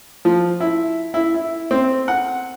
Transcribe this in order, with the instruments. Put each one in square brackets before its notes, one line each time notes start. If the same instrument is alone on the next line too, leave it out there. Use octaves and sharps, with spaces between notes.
[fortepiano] F3
E4
E4
E4
C4
F#5